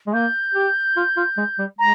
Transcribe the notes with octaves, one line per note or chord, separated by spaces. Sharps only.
G#3
A#3 G6
G4
F4
F4
G#3
G3
G#3 A#5